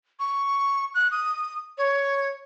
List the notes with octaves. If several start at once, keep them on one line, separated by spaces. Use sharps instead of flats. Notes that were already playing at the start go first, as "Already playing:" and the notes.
C#6
F#6
D#6
C#5